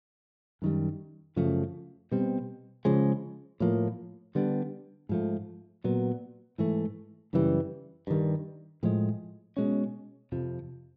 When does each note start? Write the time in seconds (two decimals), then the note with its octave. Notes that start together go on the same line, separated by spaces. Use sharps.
0.62 F#2 D#3 G3
1.36 F#2 C#3 F3 A3
2.12 B2 G3 C4
2.85 C#3 F3 G#3
3.60 A2 F3 A#3
4.35 D3 G3 B3 D4
5.09 G#2 F3 A3
5.84 A#2 F#3 B3
6.58 G#2 E3 A3
7.33 F#2 C#3 E3 G3
8.07 G2 D#3 G3
8.83 A2 F3 G#3
9.57 B2 G#3 C#4
10.32 F2 C3 F3